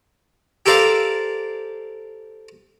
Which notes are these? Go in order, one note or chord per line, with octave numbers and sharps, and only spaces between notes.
G4 A4 A#4 C5 D5 F5